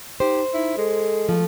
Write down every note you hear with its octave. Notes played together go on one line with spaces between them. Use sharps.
D#4 G4 C5
D#4 E4
G#3 A4
F3 A3